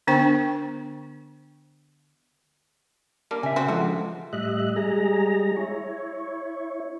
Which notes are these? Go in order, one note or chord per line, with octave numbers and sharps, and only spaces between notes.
D3 B3 D4 C5 G5 C#6
G3 A#3 D4
C#3 E5 G#5
C4 F#4
D3 F3 G#3 F#4
A2 G3 D#5 E5 F#6
G3 G#3 G#4 A#5
E4 C#5